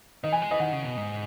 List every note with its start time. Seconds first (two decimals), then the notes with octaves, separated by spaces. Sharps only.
0.24 D#3 D#5
0.32 E3 G#5
0.42 G#3
0.51 E3 D#5
0.60 D#3 F#5
0.73 C#3
0.85 B2
0.97 G#2